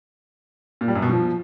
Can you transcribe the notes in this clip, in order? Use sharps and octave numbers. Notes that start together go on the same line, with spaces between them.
A#2
G3
F#2
B2
F3